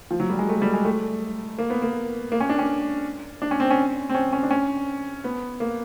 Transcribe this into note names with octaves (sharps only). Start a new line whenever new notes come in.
F3
F#3
G3
G#3
A3
G3
G#3
A3
A#3
B3
A#3
A#3
C#4
D4
C#4
D4
C#4
C4
C#4
C4
C#4
C#4
D4
C#4
B3
A#3